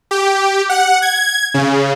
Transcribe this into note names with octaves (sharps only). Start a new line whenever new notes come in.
G4
F#5
G#6
C#3